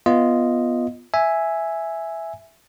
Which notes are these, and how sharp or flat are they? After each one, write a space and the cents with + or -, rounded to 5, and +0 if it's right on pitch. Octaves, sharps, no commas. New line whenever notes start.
B3 +0 F4 -10 D#5 +0
E5 +0 G#5 +0